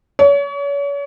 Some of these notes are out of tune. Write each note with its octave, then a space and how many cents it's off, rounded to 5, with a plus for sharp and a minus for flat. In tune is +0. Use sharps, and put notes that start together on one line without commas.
C#5 +35